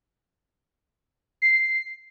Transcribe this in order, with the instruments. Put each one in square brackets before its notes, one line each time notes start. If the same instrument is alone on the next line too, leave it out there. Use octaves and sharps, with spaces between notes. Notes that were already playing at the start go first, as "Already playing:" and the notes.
[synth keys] C7